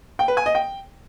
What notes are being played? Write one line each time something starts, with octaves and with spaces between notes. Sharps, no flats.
G5
B4
G#5
D#5
G5